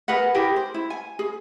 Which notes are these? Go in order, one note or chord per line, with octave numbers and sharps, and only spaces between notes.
G#4 A#4 B4 F#5
E4 G4 G#4 A#4
C5
E4
G#5
G#4